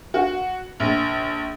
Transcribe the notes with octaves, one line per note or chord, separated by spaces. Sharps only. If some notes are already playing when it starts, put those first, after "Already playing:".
F#4
A#1